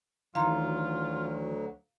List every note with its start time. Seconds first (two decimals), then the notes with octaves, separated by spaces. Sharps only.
0.35 D2 D#3 E3 F#3 F4 F5 A#5 C6